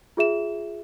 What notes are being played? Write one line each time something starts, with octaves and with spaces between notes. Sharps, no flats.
F4 G#4 E5 E7